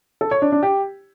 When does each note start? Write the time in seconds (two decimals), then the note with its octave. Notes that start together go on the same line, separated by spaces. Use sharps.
0.21 A4
0.31 C#5
0.42 D4
0.52 D4
0.63 G4